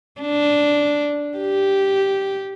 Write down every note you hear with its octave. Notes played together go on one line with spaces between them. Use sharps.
D4
G4